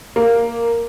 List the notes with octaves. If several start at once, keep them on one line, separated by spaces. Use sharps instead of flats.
A#3